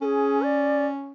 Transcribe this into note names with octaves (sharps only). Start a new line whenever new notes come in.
C#4 G#4 A4
D5